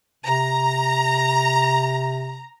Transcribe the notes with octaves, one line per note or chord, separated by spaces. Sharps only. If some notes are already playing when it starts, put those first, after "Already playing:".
C3 A#5